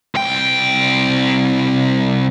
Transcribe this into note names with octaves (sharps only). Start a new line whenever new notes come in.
C2 G5